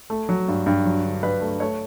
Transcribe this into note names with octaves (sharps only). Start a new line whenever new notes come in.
A3
F#3
G2
G2
F#3
D3
G2 B4
A3
A3 C#5